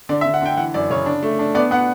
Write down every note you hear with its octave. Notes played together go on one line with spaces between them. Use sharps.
D3 D5
E5
D3
F#5
D3 G5
E3 F#5
F#2 D5
C#3 C#5
D4
A3
D4
B3 D5
B3 F#5